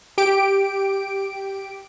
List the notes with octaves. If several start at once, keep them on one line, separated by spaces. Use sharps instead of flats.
G4 D7